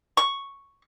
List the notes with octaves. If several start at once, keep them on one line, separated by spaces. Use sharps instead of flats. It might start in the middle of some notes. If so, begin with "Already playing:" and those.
C#6